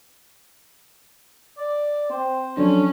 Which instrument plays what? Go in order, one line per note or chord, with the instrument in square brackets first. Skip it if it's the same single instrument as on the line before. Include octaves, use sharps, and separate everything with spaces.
[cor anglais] D5
[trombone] C4 [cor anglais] C5
[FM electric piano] F3 F#3 D4 [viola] C#4 [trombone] A4